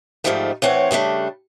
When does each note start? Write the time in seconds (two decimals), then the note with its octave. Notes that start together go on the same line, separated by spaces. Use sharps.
0.24 G#2 D3 D#3 F3 G3 A3
0.62 A2 E3 C4 C#5 F#5
0.91 C#3 G3 A3 D4